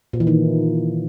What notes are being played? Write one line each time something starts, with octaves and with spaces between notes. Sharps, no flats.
A#2
E3
D#3